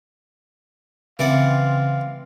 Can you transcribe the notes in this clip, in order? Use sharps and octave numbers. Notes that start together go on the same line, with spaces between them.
C#3 E3 C4 D5 F5 F#5